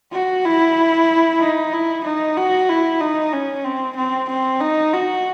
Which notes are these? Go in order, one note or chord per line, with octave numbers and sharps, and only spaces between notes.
F#4
E4
D#4
E4
D#4
F#4
E4
D#4
C#4
C4
C4
C4
D#4
F#4